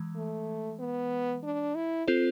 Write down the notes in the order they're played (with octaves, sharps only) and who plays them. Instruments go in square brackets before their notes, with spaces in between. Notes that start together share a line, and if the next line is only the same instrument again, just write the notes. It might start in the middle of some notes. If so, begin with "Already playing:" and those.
Already playing: [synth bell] E3 G#3
[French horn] A3
B3
D4
E4
[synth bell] C4 F4 A4 C5